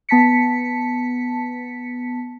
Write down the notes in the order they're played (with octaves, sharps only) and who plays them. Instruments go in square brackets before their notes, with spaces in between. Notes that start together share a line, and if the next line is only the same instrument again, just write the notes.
[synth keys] B3 A5 B6 C#7